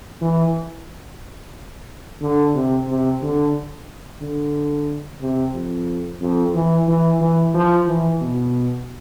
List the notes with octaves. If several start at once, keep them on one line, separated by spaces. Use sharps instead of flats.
E3
D3
C3
C3
D3
D3
C3
F2
F2
E3
E3
E3
F3
E3
B2